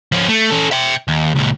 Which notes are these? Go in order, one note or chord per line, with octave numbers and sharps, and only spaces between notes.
F3 C#4
A3
C#4 A4
E5 G5
D#2
C#2 A#2